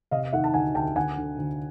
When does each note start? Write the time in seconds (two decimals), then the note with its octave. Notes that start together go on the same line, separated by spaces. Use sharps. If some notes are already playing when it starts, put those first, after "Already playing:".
0.11 C3 D#5 F5
0.33 D#3 E5 F#5
0.44 A5
0.54 D2 F#5 G#5
0.75 D2 G5 A5
0.96 D2 F#5 G#5
1.18 D3
1.38 D2